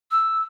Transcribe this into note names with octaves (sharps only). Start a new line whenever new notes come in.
E6